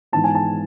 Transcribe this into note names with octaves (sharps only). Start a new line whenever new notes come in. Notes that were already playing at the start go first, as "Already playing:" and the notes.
G#2 E3 B3 A5
G#5
A5